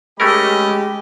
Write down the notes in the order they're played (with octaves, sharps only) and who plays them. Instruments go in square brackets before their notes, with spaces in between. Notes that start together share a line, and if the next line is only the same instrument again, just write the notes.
[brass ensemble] G#3 G4 [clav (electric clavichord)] A3 C#4 A#4 [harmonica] D#5 B5